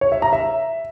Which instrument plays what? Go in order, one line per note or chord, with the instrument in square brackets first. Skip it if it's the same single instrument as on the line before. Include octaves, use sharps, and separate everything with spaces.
[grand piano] C#5
E5
A#5
E5